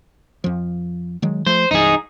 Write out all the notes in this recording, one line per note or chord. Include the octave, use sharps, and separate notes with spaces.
F2 F3
D#3 F#3 G#3
F3 A3 C5
C2 G2 E3 D#4 G#4